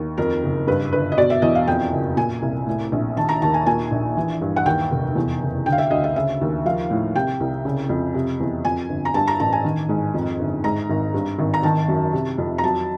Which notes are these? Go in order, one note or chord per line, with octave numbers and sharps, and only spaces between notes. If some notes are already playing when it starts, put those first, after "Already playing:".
Already playing: D#2
F2 A#4
F#1
G2 B4
G1 B4
D#5
B2 D5
E5
E2 D#5
F5
F2 G5
F#1
A#2 G#5
C2
A2
A#1
D#3 A5
A#5
D#2 A5
G#5
A#2 G#5
A#1
E3
G2
F#5
D#2 G5
F1
E2
F#1
D3 G5
F5
E5
D2 D#5
E5
C#3 E5
D#2
F3 F5
A2
C3 G5
C2
C#3
F2
C3
E2
F2 G#5
G1
A#5
G2 A5
A#5
A1 A5
G#5
D#3
G#2
F2
G1
G#2 A#5
G#1
G2
G#1
A#5
D#3 A5
F#2
C3
F2
A#5
F#3 A5